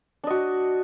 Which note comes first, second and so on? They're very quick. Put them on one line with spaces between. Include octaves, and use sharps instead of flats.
D4 D#5 F#4